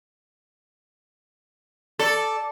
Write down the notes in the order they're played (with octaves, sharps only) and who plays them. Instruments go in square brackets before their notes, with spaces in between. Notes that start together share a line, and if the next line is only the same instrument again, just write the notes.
[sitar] A4 [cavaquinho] D5